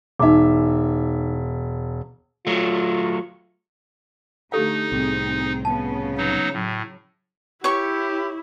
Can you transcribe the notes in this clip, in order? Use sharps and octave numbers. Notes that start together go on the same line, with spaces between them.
E1 D#4 E5 D6
F#3 A3 F4
D3 A3 D#4 G4 A4 F5
C2 A2 C3 C4 G#4
C#3 B3 C#4 A5
F#3 D#4
A2 F#3
E4 G4 C#5 G5 C#6